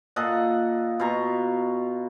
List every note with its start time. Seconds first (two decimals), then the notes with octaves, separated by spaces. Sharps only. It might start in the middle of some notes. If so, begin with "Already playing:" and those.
0.16 A#2 A4 D#5 F#5
1.00 B2 F4 A#5 C#6